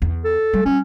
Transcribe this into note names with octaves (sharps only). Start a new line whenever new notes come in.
E2
A4
G3
G3 C#4